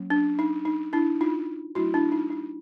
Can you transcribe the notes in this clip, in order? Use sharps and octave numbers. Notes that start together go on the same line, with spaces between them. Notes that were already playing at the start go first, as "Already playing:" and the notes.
Already playing: F#3 A#3 C#4
D4
D#4
D#4
D4 E4
D#4 F4
F#3 A3 D4 E4 F#4
D4 E4
D#4
D#4